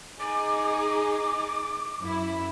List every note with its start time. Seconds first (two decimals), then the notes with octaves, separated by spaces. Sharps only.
0.20 D#4 G#4 D6
2.00 F#2 E4